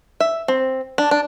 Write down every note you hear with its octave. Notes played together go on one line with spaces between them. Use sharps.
E5
C4
D4
D4